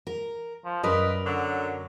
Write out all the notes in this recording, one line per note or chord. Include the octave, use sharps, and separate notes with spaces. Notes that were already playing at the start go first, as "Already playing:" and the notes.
A#4
F3
F#2 A#4 B4 D5 D#5
D3 F#3